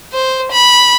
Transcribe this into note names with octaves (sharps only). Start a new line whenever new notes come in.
C5
B5